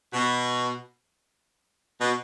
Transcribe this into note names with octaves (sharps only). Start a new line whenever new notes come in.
B2
B2